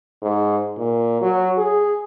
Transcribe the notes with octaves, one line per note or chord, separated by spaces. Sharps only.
G#2
A#2
F#3
G#4